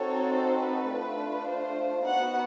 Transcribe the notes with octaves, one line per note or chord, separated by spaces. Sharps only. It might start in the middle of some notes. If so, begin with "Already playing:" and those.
Already playing: C4 D#4 F#4 A4 C#5
C5
B4
A3 D4 F4
C5
B3 D#4 F#4 F#5